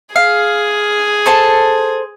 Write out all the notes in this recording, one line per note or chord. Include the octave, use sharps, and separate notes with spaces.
G#4 F5
A4 C5 A5